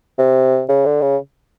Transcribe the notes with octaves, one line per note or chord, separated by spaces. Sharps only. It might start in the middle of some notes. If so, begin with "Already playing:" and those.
C3
C#3
D3
C#3